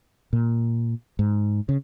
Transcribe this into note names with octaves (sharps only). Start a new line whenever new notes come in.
A#2
G#2
C#3